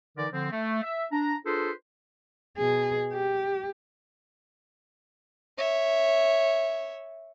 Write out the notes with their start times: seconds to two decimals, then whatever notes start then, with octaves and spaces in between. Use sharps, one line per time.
0.17 D3 E3 D#4 A#4 D5
0.32 D3 F3 C4
0.51 A3
0.83 E5
1.12 D4 A#5
1.45 D4 F4 G#4 A4 B4 C5
2.58 B2 G#4
3.13 G4
5.58 C#5 E5